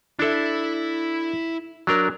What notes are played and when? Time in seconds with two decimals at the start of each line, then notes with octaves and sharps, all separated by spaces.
0.19 D4 E4 A4 E5
1.87 F#3 D4 A#4